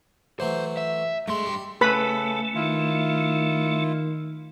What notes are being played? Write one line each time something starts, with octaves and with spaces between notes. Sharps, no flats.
E3 F#3 A3 C5
E5
G2 G#3 A3 C6
G3
C#3 A3 A4 B4 B5
D#3 E4 F4